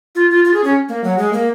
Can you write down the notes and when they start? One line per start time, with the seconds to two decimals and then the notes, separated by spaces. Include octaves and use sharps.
0.15 F4
0.30 F4
0.45 F4
0.54 G#4
0.64 C#4
0.89 A#3
1.04 F#3
1.18 G#3
1.33 A#3